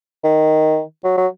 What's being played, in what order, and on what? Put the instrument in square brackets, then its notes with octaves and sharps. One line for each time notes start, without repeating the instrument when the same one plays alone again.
[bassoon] D#3
F#3
F#3